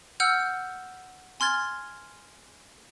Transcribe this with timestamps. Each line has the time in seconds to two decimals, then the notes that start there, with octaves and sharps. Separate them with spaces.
0.20 F#5 E6 F6 G6
1.40 G#5 C6 F6 G#6 A6